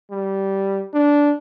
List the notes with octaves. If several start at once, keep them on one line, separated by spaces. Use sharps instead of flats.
G3
D4